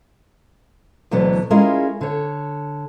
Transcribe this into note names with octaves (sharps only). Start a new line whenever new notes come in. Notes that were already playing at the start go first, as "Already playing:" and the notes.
D2 B2 E3 F#3 B3 D4
G#3 C#4 E4 F4 G#4 A#4
D3 C#5